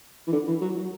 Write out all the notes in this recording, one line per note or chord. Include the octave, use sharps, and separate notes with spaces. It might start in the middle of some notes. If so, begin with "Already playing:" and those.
E3
D3
E3
F#3
F#3